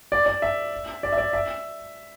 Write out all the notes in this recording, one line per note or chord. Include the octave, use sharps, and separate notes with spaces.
D5
D5
E5
D5
E5
D5
E5